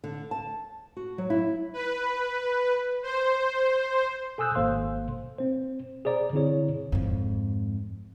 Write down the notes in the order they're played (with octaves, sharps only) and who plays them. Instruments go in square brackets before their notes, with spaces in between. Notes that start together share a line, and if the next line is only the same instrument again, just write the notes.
[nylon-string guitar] D3
A5
F#4
F#3
E4
[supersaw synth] B4
C5
[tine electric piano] A4 G#5 D#6 E6 F#6 G6
G#1 A#3 A4 C5 F5 C6
C4 C5
G#4 C5 D5 A#5
D3 C4 E4 G#4 C#5
[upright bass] F2 G#2